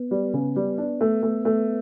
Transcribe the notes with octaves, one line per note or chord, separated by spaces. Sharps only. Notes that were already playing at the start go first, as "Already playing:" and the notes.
Already playing: B3
G3
C#3
G3
D4
A3
A3
A3